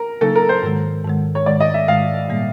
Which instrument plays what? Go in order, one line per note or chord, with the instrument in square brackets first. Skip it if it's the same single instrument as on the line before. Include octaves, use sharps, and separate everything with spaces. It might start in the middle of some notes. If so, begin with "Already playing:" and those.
Already playing: [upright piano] A#4
[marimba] C#3 F#3 A#3 D#4 [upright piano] A4
[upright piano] A#4
C5
[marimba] G#2 D#3 G#3
G#2 D#3 G#3
[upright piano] C#5
[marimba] G#2 D#3 G#3 [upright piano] D5
[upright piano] D#5
E5
[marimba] G#2 D#3 G#3 [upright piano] F5
[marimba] A#2 G3 A#3